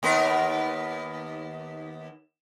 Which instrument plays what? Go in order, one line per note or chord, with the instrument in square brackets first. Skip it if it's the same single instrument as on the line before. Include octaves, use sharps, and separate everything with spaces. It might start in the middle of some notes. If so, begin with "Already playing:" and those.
[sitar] D#2 B3 A#4